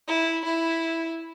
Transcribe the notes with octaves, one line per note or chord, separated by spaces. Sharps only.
E4
E4